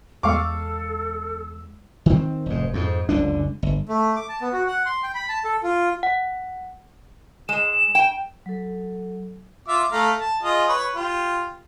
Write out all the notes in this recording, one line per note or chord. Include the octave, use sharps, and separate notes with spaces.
E2 G#3 A4 F5 C#6 D6 E6
D#3 C4
F1 G#2
F2 G#2
F#1 C#2 D3 D4
G1
A3
D6
A5
B3
F#4
F#5
C6
G5
B5
A5
A4
F4
F#5
G#3 E7
G5
F#3 A4
F4 E5 D6
A3 F5 A#5
A5
F4 G#4 D#5
B4 C#5
F4 G4